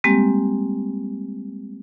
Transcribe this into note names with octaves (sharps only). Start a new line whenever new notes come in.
G3 G#3 A#3 C4 G4